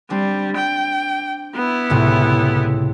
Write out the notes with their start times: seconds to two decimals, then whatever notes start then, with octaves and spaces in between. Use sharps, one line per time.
0.10 G3 C4 D4
0.56 G5
1.55 B3 E4
1.90 C#2 A2 C3